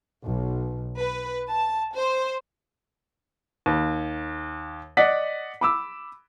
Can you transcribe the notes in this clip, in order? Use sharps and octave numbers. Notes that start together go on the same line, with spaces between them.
B1
B4
A5
C5
D#2
D5 D#5 F#5 B6
B5 D6 E6